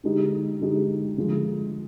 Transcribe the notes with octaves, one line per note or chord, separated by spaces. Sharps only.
D3 G#3 D#4 G4
D3 G#3 D#4 G4
D3 F3 G#3